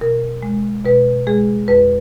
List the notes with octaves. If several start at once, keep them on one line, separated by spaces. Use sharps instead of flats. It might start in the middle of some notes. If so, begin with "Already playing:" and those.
B2 A#4
G#3
B2 B4
G#3 G#4
F2 B4